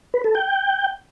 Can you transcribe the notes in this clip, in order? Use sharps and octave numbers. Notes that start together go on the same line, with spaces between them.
B4
A4
G5